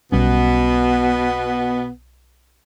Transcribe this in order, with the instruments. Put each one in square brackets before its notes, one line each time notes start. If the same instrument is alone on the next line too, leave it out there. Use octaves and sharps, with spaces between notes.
[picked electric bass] B1 G3 C#4 [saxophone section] B2 B3